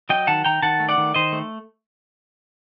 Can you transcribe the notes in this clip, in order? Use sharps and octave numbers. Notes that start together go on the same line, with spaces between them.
F#3 D#5 G5
D#3 F#5 A5
D#3 G5 A#5
D#3 F#5 A5
A3
D5 F#5
D#3
D#3 C5 D#5
A3